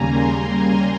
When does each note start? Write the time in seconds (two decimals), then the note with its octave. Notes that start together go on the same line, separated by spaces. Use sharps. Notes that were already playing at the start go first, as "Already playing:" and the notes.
Already playing: D#2 C#3 G3 A#3 G#5 A#5
0.08 C6